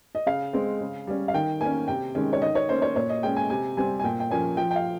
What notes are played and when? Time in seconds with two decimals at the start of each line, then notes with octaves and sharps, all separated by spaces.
0.15 D#5
0.26 C#3 F5
0.53 G#3 C4
0.81 C#3
1.07 G3 C#4
1.28 F5
1.34 D#3 G5
1.61 A#3 C#4 G#5
1.88 C3 G5
2.15 D#3 G#3 C#4
2.33 C#5
2.42 D#3 D#5
2.55 C#5
2.69 A#3 C#4 C5
2.82 C#5
2.96 A#2 C#5
3.09 D#5
3.23 G#3 C#4 G5
3.36 G#5
3.50 C3 G#5
3.77 G3 C4 G#5
4.00 G#5
4.03 A#2 G5
4.20 G5
4.31 F3 A#3 C#4 G#5
4.57 F3 G5
4.71 G5
4.76 F5